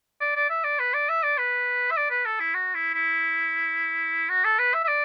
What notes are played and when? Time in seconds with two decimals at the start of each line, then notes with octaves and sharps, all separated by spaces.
0.21 D5
0.36 D5
0.50 E5
0.64 D5
0.79 B4
0.94 D5
1.09 E5
1.23 D5
1.38 B4
1.91 E5
1.97 D5
2.10 B4
2.26 A4
2.40 E4
2.54 F#4
2.75 E4
2.94 E4
4.29 F#4
4.45 A4
4.59 B4
4.74 E5
4.84 E5
4.88 D5